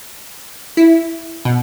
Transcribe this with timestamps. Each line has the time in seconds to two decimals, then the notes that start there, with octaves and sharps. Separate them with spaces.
0.77 E4
1.45 B2